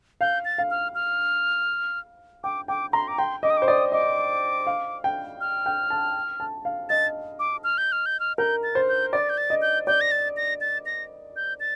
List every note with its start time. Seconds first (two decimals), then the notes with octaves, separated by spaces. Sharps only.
0.21 F5 G6
0.45 A6
0.58 F5
0.71 F6
0.95 F6
2.44 G5 D6
2.68 G5 D6
2.93 A#5 C6
3.08 D6
3.18 G5 C6
3.43 D#5 D6
3.50 D#6
3.57 D6
3.62 C5
3.67 D5 D#6
3.92 D#5 D6
4.67 F5
5.04 G5
5.41 F6
5.66 G5
5.90 A5
6.40 A5
6.65 F5
6.89 D#5 A6
7.39 D6
7.64 F6
7.78 G6
7.92 F6
8.06 G6
8.20 F6
8.38 A#4 G6
8.63 A6
8.75 C5
8.89 G6
9.13 D5 A6
9.30 G6
9.38 A6
9.50 D#5
9.62 G6
9.87 D5 G6
10.01 A#6
10.11 A6
10.37 A#6
10.61 A6
10.86 A#6
11.36 G6
11.60 A6